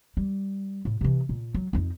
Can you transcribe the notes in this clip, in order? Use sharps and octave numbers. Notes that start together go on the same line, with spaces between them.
G3
A2
C3 E3
A#2
F#3
F2 D#4